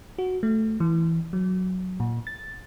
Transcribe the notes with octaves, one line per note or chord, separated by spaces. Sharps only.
F#4
A3
E3
F#3
A#2
A6